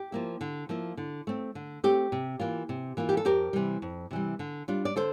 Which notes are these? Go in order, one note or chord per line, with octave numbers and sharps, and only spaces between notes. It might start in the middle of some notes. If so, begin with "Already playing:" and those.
Already playing: G4
F3 A#3 E4
D3
F3 A#3 E4
D3
A3 C4
D3
A3 C4 G4
C3
E3 A#3 F4
C3
E3 A#3 F4
G4
A4
F2 G4 A#4
C3 E3 G3
F2
C3 E3 G3
D3
G3 D4 F4
D5
D3 A4 C5